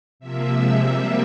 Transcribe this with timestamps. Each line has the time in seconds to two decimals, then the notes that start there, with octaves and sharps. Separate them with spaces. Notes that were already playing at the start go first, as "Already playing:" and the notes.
0.19 C3 F3 A#3 E5
0.50 C3 F3 G#3
0.79 C3 G3 A#3